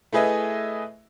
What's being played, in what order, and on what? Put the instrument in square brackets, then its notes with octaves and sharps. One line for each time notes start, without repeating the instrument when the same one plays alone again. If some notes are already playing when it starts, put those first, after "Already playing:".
[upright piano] A3 E4 G#4 B4 D#5 E5